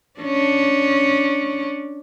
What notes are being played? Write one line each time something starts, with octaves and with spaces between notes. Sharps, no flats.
C#4 D4